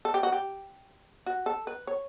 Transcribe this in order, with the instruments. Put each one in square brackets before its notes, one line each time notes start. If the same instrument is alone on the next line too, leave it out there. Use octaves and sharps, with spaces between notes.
[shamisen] A4
G4
F#4
G4
F#4
A4
B4
C#5